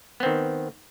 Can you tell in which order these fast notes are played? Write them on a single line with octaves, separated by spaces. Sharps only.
B3 C4 D#3